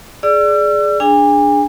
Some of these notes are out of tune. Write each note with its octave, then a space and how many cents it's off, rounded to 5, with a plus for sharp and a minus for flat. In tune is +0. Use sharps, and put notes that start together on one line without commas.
G#4 +15 D5 +0 E6 +40
D4 +0 G#4 +0 G#5 -40